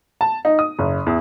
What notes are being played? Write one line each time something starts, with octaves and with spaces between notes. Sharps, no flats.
A5
D#4
D#6
F#1
E2